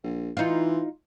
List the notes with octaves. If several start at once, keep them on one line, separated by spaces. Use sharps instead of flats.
A#1
E3 D#4 F4